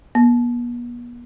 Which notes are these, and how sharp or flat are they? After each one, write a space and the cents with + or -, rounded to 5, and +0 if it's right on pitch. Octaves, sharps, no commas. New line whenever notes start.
B3 -45